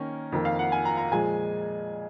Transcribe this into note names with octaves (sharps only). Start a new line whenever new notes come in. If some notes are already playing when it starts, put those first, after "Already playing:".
Already playing: D#3 A#3 C#4 A#4
F2 D#3 A#3
F5
F#5
G#5
A#5
A#5
A#2 F3 G#3 G#5